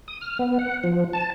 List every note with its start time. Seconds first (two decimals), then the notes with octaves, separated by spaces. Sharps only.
0.08 D#6
0.21 F6
0.39 B3
0.59 F#5
0.84 F3
1.13 A5